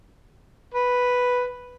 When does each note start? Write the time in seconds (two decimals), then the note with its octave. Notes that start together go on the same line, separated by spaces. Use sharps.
0.74 B4